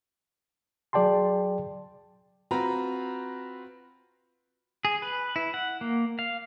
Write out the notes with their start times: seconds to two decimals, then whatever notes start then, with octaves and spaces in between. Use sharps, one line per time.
0.93 F#3 G#4 D5 G5 A5 C6
2.51 C4 F4 F#4 B4 A#5
4.85 G#4
5.02 B4
5.36 E4
5.54 F#5
5.81 A#3
6.19 F5